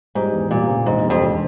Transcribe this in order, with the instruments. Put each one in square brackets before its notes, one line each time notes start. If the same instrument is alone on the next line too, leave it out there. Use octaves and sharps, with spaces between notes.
[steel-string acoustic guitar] G#2 [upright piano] G3
[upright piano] E2
[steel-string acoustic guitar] A#2 [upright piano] G3
[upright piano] C#3
[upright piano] E1 [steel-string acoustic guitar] G#2
[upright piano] G3
[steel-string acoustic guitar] F2
[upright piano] E1